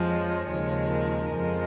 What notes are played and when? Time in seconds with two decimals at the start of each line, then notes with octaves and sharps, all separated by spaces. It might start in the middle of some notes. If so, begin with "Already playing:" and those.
Already playing: F2 F3 G#3
0.08 C#5
0.50 D#2 C#3 F3 G#3
0.91 A#4
1.34 F2 F3 G#3